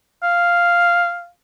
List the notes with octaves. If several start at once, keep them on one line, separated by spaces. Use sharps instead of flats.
F5